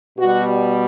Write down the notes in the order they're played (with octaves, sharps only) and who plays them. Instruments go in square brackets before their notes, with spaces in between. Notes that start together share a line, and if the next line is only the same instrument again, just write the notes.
[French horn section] B2 G3 F#4